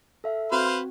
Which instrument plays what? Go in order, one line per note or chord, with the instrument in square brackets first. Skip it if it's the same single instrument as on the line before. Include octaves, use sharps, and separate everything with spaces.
[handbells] A4 E5 F5
[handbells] C4 F#4 [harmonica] B4 C5 F5